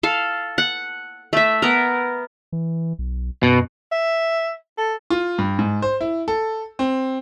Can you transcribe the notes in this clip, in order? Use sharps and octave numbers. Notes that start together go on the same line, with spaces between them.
A4 F5 A5
F#5
A3 E5
B3 A#4
E3
B1
F#2 B2
E5
A4
F4
G2
G#2
C5
E4
A4
C4